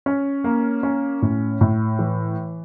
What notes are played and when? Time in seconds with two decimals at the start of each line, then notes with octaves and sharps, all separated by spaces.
0.06 C#4
0.44 A#3
0.83 C#4
1.22 A2
1.61 A2
1.99 E3